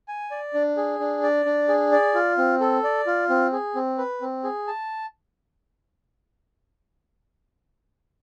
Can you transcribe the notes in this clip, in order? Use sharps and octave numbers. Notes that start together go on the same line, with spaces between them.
G#5
D5
D4
G#4
D4
D5
D4
G#4
D5
F4
C4
A4
D5
F4
C4
G#4
C4
B4
C4
G#4
A5